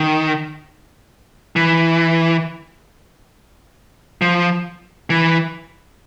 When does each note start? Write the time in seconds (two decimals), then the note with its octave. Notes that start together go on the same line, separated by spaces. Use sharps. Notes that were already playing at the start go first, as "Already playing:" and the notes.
Already playing: D#3
1.56 E3
4.22 F3
5.10 E3